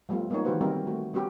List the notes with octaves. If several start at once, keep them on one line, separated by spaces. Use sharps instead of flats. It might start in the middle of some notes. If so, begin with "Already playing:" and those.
F3 G3 A3 B3 F4
G#3 A#3 B3 C#4 D#4 C#5
D#3 E3 F#4 G4 B4 C5
G3 C4 D#4 A#4
A3 F#4
G3 B3 C#4 F#4 G4